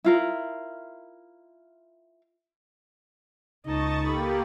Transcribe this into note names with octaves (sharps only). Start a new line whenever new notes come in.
E4 F4 A#4
C#2 D#4 D#5 A5 C#6 D#6 A6
A#3 G4 A4 B5